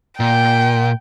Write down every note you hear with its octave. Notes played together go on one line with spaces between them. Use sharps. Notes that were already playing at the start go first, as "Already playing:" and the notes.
A#2 G5